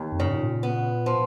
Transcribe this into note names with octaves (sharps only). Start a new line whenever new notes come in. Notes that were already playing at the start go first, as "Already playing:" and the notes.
Already playing: D#2
F2
F#2 C#3
G#2
A#2
B3
F3